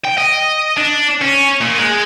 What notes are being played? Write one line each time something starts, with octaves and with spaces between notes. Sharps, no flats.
G5
D#5
D4
C#4
A#2
G#3